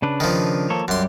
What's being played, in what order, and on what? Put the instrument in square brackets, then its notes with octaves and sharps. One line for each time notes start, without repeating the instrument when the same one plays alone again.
[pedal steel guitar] C#3 D4 B4
[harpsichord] D#3 F3
[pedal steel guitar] A#3 A4 C#5
[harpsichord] F#2 C6 [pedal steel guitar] G3 G4